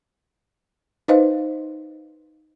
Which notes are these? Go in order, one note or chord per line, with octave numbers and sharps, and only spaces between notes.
D#4 B4 C5 D#5 F5